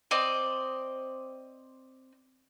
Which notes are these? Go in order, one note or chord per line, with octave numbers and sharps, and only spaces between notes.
C4 D5 D#5